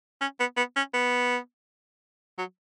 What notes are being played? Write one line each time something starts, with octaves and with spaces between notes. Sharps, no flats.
C#4
B3
B3
C#4
B3
F#3